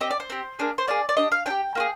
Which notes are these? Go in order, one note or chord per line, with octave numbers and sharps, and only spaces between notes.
C4 G4 D#5
D5
C5
C4 G4
A#3 D4 G#4
C5
A#3 D4 G#4 D5
D5
D4 G4 D#5
F5
D4 G4 G5
A#3 F4 G#4